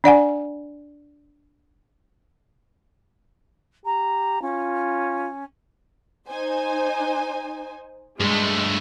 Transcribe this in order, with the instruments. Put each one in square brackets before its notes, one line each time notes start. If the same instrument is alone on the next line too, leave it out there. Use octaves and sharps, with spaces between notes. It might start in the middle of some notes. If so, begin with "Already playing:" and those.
[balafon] D4 D5 F#5 G#5
[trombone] G4 [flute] A#5
[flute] C#4 [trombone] F4
[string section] D#4 C5 G#5
[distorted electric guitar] G2 A3 [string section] G#3